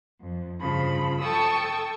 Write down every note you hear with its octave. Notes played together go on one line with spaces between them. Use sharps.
F2
G2 C#3 F3 B5
A4 G5 A5 C#6 D#6 E6